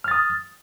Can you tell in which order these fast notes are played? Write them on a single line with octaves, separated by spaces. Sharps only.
F6 A6 D#6